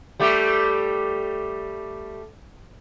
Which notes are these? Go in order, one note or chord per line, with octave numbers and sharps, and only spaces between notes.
G3 A3 G4